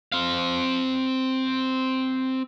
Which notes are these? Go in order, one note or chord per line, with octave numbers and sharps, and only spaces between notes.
C4 F5